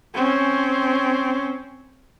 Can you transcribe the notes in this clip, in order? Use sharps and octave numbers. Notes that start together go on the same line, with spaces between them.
C4 C#4